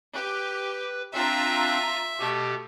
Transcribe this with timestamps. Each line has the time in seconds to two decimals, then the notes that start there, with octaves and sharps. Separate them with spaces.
0.15 G4 B4
1.14 C4 D4 F4 E5 A#5
2.19 B2 A3 G4